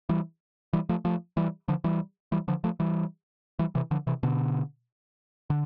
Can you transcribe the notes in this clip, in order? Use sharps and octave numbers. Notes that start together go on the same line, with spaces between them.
E3 G3
E3 G3
F3 A3
F3 A3
E3 G3
D3 F3
E3 G3
E3 G3
D3 F3
F3 A3
E3 G3
E3 G3
C3 E3
D3 F3
C3 E3
B2 D3
D3